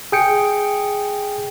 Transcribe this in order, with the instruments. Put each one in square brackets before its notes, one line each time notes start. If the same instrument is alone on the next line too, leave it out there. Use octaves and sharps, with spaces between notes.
[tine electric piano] G#4 G5 C#7